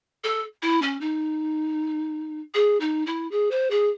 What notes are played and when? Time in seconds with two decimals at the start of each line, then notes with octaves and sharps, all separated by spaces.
0.24 A4
0.62 E4
0.81 C#4
1.00 D#4
2.54 G#4
2.80 D#4
3.06 E4
3.31 G#4
3.51 C5
3.70 G#4